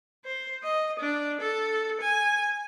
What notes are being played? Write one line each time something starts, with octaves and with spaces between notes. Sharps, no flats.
C5
D#5
D4
A4
G#5